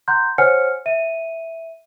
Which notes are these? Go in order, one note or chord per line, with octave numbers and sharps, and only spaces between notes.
F#5 A#5 C6 F#6 G6
C5 C#5 F#5 G#5 F6 C#7
E5 D#7